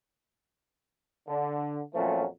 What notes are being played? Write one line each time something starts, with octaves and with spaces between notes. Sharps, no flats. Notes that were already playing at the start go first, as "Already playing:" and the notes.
D3
F2 A#2 F3 F#3 A3 C#4